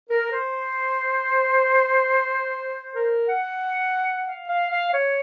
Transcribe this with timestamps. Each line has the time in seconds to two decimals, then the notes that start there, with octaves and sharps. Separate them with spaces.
0.09 A#4
0.31 C5
2.94 A#4
3.27 F#5
4.26 F5
4.48 F5
4.70 F5
4.92 C#5